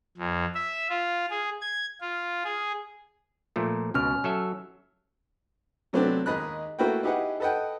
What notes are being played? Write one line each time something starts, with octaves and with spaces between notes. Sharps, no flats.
F2
E5
F4
G#4
G#6
F4
G#4
A#2 F3 A3
C#2 B2 C#4 F6
F#3 A4 E5
C3 F#3 A3 B3 C4 D4
D#2 G#3 D#5 B5 F#6
A3 A#3 E4 F#4 B4 G5
D#4 E4 G4 G#4 B4 F#5
A4 B4 D#5 F#5 G5